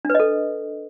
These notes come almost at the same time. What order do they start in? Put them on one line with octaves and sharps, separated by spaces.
D4 B4 D#5 A4